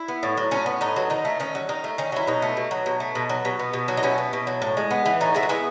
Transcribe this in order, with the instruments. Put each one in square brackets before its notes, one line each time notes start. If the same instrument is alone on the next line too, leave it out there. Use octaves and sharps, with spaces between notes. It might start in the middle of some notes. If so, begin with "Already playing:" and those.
Already playing: [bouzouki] E4
B3
A2
F#3
A2 C#4
B3
A2 D#4
F#3
D#3 D#4
A3
D#3 C#4
F#3
D#3 D#4
A3
D#3 C#4
F#3 E4
B2 D#4
A3
B2
F#3
B2
A3
B2
F#3
B2
B3
B2
F#3
D#4
B2 C#4 E4
B3
B2
F#3
A2
G#3
B3
E3
A2 D#4 F#4
G#3 E4
F#4
B3 E4 G#4